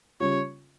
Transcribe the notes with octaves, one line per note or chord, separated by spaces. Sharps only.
C#3 G3 C#4 F4 C#5